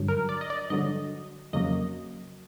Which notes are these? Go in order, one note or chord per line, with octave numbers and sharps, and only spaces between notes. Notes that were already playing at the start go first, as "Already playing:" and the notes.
Already playing: G2 D3 F#3
A#4
D5
D#5
D5
G2 D3 F#3 D#5
F2 C#3 F#3 A#3 D#5